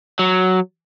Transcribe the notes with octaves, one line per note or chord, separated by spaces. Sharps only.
F#3